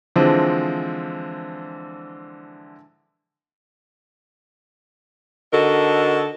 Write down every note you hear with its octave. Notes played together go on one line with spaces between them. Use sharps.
D3 E3 F3 G#3 C4
D3 D#4 F#4 A4 A#4